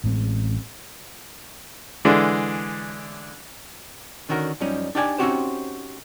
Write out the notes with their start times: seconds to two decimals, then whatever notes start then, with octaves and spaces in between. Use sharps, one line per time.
0.04 A1 A2 G#3 C4
2.05 D3 E3 G#3 D4
4.29 D3 D#3 C#4 F#4 A#4
4.60 F#2 F3 G3 C#4 D#4
4.95 D4 D#4 G4 D5 F#5 G#5
5.18 C4 C#4 D#4 F#4 G4 C5